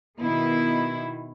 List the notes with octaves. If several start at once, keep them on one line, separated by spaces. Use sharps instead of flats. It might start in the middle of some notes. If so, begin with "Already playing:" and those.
B2 D#3 E4